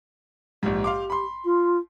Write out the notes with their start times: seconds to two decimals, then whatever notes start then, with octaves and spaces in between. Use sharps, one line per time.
0.63 A#1 G#2 G4
0.84 F5 C6 D6
1.10 B5 C6
1.44 F4